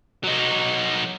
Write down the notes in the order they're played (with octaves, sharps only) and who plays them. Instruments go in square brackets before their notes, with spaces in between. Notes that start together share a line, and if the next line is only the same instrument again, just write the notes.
[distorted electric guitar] F#3 D#4